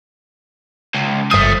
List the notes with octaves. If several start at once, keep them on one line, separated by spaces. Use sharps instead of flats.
C#2
G1 F3 A3 D#6